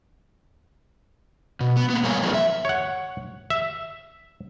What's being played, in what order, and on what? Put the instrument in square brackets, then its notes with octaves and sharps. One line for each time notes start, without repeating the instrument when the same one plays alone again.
[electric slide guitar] B2
B3
A#3 B3
G3 B3 A#4 C#5 F5 G#5
F3 A#3 C4 F4 G#4 B4
E5
[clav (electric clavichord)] C#5 F#5
E5